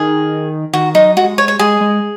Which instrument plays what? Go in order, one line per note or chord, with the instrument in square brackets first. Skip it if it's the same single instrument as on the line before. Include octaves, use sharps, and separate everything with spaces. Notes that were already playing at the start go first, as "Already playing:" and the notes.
Already playing: [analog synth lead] D#3 [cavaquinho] G#4
[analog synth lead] D#3 [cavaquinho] F#4
[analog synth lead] F#3 [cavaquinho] D#4
[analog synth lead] G#3 [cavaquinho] F#4
[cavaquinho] C#5
C#5
[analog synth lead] G#3 [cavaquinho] G#4
[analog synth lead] G#3